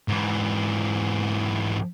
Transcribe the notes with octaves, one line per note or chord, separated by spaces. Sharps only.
G#2 E3